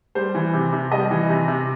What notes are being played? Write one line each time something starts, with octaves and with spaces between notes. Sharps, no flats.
G3 C5
E3
C3
C3
G3 D#5
E3
C3
C3